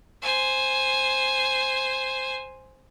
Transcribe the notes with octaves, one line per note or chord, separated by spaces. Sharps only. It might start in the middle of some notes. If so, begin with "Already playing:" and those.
C5 G#5